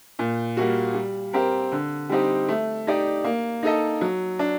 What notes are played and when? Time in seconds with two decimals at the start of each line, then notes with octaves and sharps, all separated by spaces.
0.19 A#2
0.57 G3 A#3 F#4
0.94 G3
1.33 C4 G4 A#4
1.72 D3
2.09 G3 C4 D#4 G4
2.48 A3
2.87 D#4 G4 D5
3.24 A#3
3.63 D#4 A4 D#5
4.01 F#3
4.39 D4